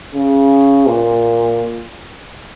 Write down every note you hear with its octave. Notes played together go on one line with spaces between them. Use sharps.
C#3
A#2